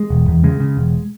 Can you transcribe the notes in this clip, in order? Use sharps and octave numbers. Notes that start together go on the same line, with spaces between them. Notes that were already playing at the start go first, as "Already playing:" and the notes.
Already playing: G#3
E1
E2
C#3 G#3
C#3
E1